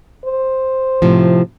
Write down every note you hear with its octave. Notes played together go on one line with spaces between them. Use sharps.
C5
A2 C3 F3